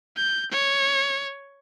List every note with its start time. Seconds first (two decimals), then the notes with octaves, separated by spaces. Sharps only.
0.17 G6
0.51 C#5